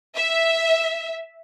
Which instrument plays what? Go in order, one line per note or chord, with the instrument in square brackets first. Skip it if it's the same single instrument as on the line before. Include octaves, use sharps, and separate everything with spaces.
[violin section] E5